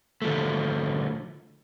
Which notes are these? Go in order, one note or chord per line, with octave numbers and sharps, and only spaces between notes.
D3 F3 A3